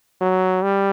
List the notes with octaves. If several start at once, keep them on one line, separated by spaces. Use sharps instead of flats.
F#3
G3